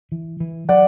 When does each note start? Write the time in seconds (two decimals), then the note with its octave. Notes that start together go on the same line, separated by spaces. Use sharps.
0.12 E3
0.40 E3
0.69 F#3 D5 F#5